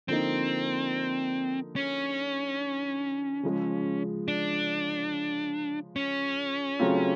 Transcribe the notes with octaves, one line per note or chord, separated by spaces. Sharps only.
D3 F3 A#3 C4 D#4
C#4
C#3 F3 G#3
D4
C#4
C#3 F#3 A3 C4 F4